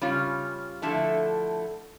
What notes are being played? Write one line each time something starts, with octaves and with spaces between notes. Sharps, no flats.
C#3 G3 C#4 F4
D3 F3 A3 E4 A4